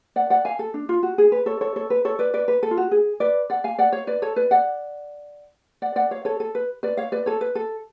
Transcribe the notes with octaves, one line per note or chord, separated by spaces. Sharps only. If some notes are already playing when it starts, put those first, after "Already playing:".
D5 F#5
D5 F#5
F5 G#5
A4
D4
F4
F#4
G#4
B4
A4 C#5
A4 C#5
A4 C#5
B4
A4 C#5
B4 D5
B4 D5
B4
A4
F4
F#4
G#4
B4 D5
D5 F#5
F5 G#5
D5 F#5
C#5 F5
B4 D5
A4 C#5
B4 D5
D5 F#5
D5 F#5
D5 F#5
C#5 F5
A4 C#5
A4
B4
B4 D5
C#5 F5
B4 D5
A4 C#5
B4
A4